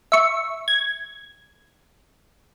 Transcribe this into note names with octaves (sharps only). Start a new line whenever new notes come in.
E5 C#6
G#6